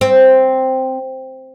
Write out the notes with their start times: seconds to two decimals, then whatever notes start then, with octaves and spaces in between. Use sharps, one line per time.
0.01 C4